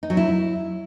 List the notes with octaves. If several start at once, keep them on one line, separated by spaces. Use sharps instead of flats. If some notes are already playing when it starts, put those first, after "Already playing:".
D#4
F#3
E4